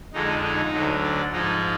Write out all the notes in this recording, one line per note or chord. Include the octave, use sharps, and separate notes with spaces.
F2 D3 G#3 D#4
D#4
D2 D3 F#3
D5
G#2 F3 G#3 D#4